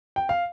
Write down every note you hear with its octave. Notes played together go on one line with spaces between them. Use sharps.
G5
F5